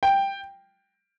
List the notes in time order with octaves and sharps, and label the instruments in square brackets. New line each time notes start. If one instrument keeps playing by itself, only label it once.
[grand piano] G5